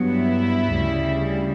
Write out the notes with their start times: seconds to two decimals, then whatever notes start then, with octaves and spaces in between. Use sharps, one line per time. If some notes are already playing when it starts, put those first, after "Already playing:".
Already playing: G2 F#3 B3
0.14 E4
0.72 D2 C#3 G3